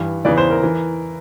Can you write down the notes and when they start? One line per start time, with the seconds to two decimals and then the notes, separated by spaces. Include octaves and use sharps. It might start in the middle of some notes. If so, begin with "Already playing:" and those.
Already playing: G2 E3
0.25 E2 C#3 E3 D5
0.38 C5
0.50 A#4
0.63 E3